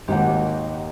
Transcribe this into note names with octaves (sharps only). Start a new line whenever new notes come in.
G#1 D#2 D#3 G4 F#5